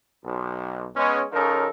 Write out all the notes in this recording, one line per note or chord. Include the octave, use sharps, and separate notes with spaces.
B1
G#3 B3 C#4
C#3 F3 C#4 D#4 A4 A#4